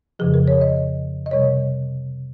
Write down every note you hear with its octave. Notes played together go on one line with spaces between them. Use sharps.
F2 C#3 F3 G#4
A#4
C#5
D#5
D#5
C3 G3 C#5